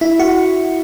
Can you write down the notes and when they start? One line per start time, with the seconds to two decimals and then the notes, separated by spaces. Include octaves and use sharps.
0.01 E4
0.19 F#4